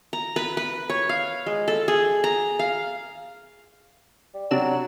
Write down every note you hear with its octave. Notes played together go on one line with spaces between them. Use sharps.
A#5
B4
B4
C#5
F5
G#3
A4
G#4
A#5
F5
G3
C3 F#3 D4 E7